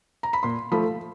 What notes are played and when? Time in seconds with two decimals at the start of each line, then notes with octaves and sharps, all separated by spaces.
0.23 A#5
0.33 B5
0.43 A#2 C6
0.72 F3 A3 B5